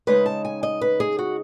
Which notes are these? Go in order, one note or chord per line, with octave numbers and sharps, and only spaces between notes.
C#3 G#3 D#4 B4
A5
G#5
D#5
B4
G#4
F#4